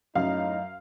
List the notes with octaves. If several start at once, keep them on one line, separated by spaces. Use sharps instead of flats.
F#2 A2 D#4 F5